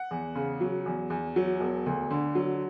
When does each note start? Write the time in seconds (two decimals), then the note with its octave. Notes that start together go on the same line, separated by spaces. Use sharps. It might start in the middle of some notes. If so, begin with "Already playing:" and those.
Already playing: F#5
0.11 E2
0.35 C#3
0.61 F#3
0.86 E2
1.10 E2
1.36 F#3
1.60 E1
1.86 D2
2.11 D3
2.35 F#3